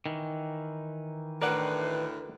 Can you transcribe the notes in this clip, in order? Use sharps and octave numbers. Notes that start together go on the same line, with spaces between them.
D#3 E3
D2 A2 A#4 B4 D5 F#5